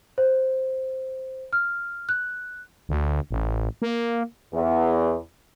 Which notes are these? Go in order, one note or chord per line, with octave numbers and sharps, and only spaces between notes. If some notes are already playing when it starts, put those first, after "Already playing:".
C5
F6
F#6
D2
A1
A#3
E2